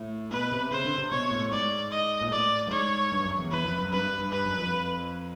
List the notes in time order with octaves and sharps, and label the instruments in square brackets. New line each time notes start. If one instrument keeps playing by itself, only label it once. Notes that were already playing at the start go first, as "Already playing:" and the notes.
Already playing: [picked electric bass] A2
[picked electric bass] B2 [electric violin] B4
[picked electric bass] C3
[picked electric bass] C#3 [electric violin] C5
[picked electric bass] D3
C3
[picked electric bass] B2 [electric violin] C#5
[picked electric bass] A2
[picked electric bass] G#2 [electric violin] D5
[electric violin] D#5
[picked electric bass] A#2
[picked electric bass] A2 [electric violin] D5
[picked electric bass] G2
[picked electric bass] G#2 [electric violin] C#5
[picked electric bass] G2
F#2
E2
[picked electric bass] E2 [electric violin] B4
[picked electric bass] F2
F#2
[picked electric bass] G2 [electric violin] B4
[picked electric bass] G2
[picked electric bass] G2 [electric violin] B4
[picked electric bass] F#2
F2